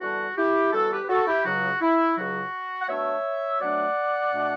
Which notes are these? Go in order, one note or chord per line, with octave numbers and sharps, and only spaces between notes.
E2 D3 G3 D4 F#4
E4 G4
E2 D3 G3 D4 F#4 A4
G4 B4
B4
F#4 A4
E4 G4
C#2 C#3 F#3 F#4
E4
C#2 C#3 F#3 F#4
F#5
B2 F#3 A3 D4 C#5 E5
B2 F#3 A3 D4 D5 F#5
B2 A3 D4